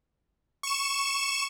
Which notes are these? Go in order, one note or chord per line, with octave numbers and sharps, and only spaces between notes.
C#6 E7